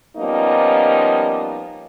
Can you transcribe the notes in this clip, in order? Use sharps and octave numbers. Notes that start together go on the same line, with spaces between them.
F3 G3 A#3 B3 C#4 D#4